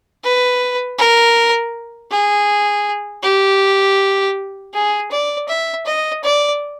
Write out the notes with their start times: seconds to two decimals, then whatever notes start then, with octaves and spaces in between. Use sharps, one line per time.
0.24 B4
0.98 A#4
2.11 G#4
3.23 G4
4.73 G#4
5.11 D5
5.48 E5
5.86 D#5
6.23 D5